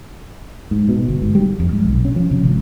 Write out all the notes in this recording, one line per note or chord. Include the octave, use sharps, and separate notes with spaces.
G#2
B2
G1
G#2
G3
F2
G#2
B1
C#4
F3
C3
G#1